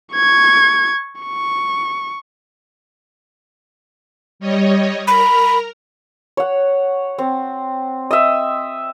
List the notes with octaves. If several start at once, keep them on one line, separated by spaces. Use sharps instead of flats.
C#6 G#6
C#6
G3 C#5 D#5
A#4 A#5 B5
C#5 F#5
C4
D#5 E5